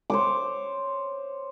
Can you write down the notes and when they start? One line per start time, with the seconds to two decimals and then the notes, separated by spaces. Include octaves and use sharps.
0.10 C5 C#5 D6